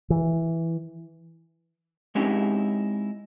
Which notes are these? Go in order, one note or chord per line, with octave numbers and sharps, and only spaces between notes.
E3
G#3 C4 C#4 D#4 E4 G4